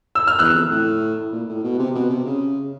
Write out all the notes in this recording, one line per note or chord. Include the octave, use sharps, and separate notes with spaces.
E6
F6
E2 E6 F#6
F2
A2
A#2
A2
B2
C3
B2
C3
C#3